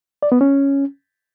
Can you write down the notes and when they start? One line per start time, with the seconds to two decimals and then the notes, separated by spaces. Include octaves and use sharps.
0.23 D5
0.32 B3
0.41 C#4